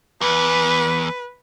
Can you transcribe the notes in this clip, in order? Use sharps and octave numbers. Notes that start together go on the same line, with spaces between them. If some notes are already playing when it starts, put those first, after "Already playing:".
E2 B4